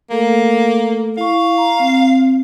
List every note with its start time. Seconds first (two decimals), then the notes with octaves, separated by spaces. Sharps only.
0.11 A3 A#3 A4
1.17 E4 F5 C#6
1.58 A#5
1.80 C4